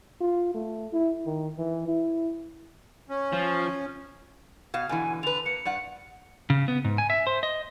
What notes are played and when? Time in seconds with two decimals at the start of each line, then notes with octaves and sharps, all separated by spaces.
0.21 F4
0.54 A3
0.93 E4
1.26 D#3
1.58 E3
1.88 E4
3.09 C#4
3.33 F3
4.74 B2 F5
4.89 B2 D3 E3 G#5
5.23 D3 B4 F7
5.46 A#3 C#7
5.65 G2 D5 F#5
6.50 C#3
6.68 B3
6.84 G#2
6.98 G#5
7.10 E5
7.27 C5
7.43 D#5